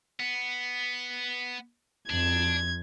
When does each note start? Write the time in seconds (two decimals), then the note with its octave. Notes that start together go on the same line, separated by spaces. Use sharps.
0.20 B3
2.10 F2 D4 G#6